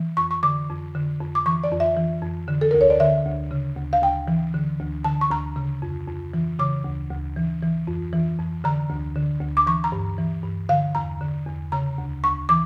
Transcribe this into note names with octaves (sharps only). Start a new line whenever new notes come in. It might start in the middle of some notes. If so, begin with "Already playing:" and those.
Already playing: E3
F2 C#6
C#6
D3 D6
F2
D3
F2
D6
E3 C#6
D5
F2
E5
E3
F2
D3
A4
D2 A#4
C#5
D5
D3 E5
D2
C#3
D2
F5
D2 G5
E3
D3
D2
D3 A5
C#6
D2 A#5
C#3
F2
F2
E3
C#3 D6
D2
D2
E3
E3
F2
E3
F2
D3 A#5
D2
D3
D2
D6
E3 C#6
A#5
G2
E3
G2
D3 F5
E2 A#5
D3
E2
C#3 A#5
D2
D2 C#6
E3 D6